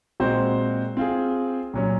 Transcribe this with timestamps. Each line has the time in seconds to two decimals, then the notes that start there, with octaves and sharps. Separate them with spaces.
0.20 A#2 G#3 C4 F#4 C5
0.97 C4 F4 G#4
1.74 A#2 F#3 C#4